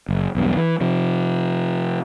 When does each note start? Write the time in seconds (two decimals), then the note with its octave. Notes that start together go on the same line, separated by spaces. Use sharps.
0.09 F#1
0.35 B1 E2 G2
0.56 E3
0.81 C3 F3